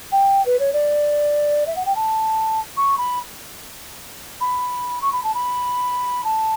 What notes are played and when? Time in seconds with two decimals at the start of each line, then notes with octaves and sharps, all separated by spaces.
0.12 G5
0.46 B4
0.59 C#5
0.73 D5
1.67 E5
1.76 F#5
1.86 G5
1.95 A5
2.77 C#6
2.98 B5
4.41 B5
5.02 C#6
5.12 B5
5.24 A5
5.34 B5
6.24 A5